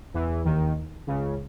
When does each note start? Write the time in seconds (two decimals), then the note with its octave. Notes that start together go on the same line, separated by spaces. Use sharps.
0.14 E2 E3
0.45 D#2 D#3
1.07 C#2 C#3